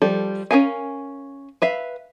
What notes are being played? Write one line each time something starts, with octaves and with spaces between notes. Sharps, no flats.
F3 G3 A4
C#4 D4 A#4 F5 G#5
B4 E5 F5